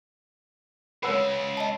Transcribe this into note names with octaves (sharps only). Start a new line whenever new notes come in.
C#3 G#3 B4 C#5 F#5 B5 E6
D#5 A5